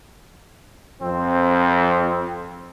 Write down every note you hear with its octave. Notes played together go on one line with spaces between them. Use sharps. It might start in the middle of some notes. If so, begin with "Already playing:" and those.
F2 C4